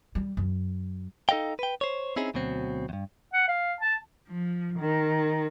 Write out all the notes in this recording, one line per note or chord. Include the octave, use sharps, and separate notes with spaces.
G3
F#2
D#4 A4 D#5 F5 G5
B4 G5
C5 C#5
C4 C#4 D#4 E4 G#4
D2 B2 F#3 C4
E2 G2
F#5
F5
A5
F3
D#3